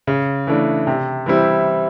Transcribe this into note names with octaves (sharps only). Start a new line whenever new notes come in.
C#3
E3 A3 D4
C3
E3 G3 C4 E4